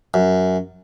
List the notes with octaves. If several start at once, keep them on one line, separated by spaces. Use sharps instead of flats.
F#2